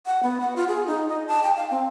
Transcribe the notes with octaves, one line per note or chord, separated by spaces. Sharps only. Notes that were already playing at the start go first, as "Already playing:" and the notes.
F#5
B3
F#5
F4
G#4
D#4
D#5
A5
G5
F5
C4